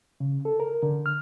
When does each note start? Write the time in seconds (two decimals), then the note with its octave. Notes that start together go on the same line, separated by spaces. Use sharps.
0.20 C#3
0.45 A4
0.60 A#4
0.83 D3
1.06 F6